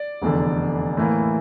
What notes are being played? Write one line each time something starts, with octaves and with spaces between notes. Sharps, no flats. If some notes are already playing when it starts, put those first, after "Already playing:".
Already playing: D5
F1 E2 D3
A2 E3 A#3